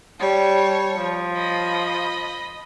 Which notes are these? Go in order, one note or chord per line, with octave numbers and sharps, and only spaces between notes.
G3 C#5 A5
F3
D#5 B5